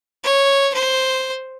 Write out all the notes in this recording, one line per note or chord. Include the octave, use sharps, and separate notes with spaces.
C#5
C5